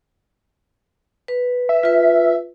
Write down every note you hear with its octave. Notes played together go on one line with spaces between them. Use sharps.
B4
E5
F4 B4